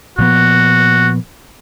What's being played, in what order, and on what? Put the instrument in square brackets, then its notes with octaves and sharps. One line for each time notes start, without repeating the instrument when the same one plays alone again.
[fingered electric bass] A#2 F3 B3 [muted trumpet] F#4